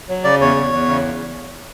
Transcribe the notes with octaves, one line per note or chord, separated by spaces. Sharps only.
F#3
C#3 D5
E2 C#5
E2
E2
C#3